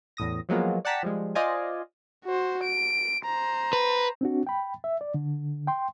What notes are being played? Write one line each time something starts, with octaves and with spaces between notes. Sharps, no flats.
E2 A2 D#6 A#6
F3 F#3 G#3 A#3 B3 F4
D5 F#5 G5 A5 A#5 B6
F3 G3 G#3
F4 C5 D5 D#5 F5 G#5
F#4 C5
D7
C5 A#5
B4
C4 D4 F#4
G5 B5
E5
D5
D3
G5 C6